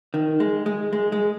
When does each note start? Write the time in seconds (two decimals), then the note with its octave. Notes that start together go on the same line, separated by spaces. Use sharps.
0.14 D#3
0.40 G#3
0.66 G#3
0.93 G#3
1.12 G#3